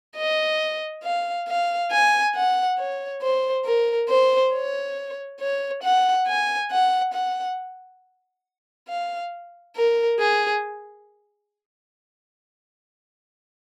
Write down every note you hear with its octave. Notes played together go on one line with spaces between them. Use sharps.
D#5
F5
F5
G#5
F#5
C#5
C5
A#4
C5
C#5
C#5
F#5
G#5
F#5
F#5
F5
A#4
G#4